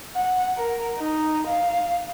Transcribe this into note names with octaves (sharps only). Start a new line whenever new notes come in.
F#5
A#4
D#4
F5